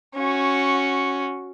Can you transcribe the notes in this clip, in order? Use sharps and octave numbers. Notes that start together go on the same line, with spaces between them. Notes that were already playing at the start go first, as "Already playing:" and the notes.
C#4 F#4